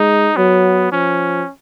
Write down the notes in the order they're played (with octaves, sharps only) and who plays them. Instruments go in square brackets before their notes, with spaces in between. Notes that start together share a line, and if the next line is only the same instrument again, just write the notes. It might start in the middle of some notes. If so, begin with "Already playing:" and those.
Already playing: [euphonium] G#3 [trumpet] D#4
[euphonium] F#3 [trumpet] B3
[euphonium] F3 [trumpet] C#4